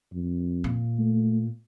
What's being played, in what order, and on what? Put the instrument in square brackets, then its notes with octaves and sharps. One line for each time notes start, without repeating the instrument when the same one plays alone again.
[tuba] F2
[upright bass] A#2
[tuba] A3